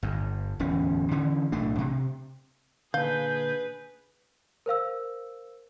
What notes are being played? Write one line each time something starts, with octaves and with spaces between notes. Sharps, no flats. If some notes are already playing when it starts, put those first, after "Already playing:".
G1 G2
D1 E2 C#4
D3 E3 C#4
B1 A2 A3 D4
C3
A#2 D3 G#4 B4 F5 G6
A#4 C5 F5 E6